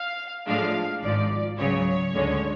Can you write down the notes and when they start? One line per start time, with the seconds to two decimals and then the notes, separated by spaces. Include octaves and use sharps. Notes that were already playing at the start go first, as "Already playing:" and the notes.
Already playing: F5
0.46 A2 F3 G#3 D4 F5
1.01 G#1 G#2 F3 D5
1.58 C#2 C#3 F#3 C#5
2.13 D2 D3 G#3 C#4